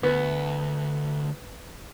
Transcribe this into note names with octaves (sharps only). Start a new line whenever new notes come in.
D2 B3